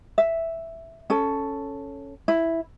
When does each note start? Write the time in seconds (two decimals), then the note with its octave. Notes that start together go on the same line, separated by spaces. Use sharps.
0.18 E5
1.10 C#4 A4
2.28 E4